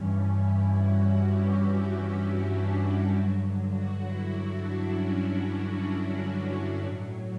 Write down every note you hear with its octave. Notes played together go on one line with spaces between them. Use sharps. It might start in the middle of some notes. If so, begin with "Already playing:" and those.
Already playing: G2 E3 G3 C#4
E4
F#4
G4
F#4
D4
E4
G2 D3 F#3 F#4
F#4
E4
D4
C#4
D4
E4
A2 F#3